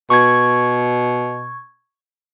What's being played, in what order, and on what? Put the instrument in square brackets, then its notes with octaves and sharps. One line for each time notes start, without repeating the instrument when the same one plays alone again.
[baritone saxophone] B2 [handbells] C#6 G#6